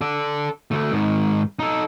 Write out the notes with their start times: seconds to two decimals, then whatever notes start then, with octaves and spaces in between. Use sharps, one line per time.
0.01 A4 D5
0.71 D2 A3
0.92 G#2 D#3
1.59 D#4 A4